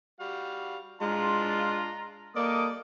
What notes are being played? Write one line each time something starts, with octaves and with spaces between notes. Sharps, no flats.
G3 F#4 F5
G#3 D4 F4 A#5 C6
G3 A#3 A4 D5 D#5 D6 D#6 F6